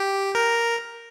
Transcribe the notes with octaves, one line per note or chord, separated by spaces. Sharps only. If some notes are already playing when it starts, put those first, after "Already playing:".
Already playing: G4
A#4